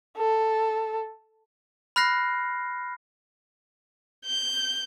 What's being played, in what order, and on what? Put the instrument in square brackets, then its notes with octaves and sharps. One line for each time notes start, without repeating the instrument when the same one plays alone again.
[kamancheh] A4
[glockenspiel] B5 F6 F#6 A#6 C7
[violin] G6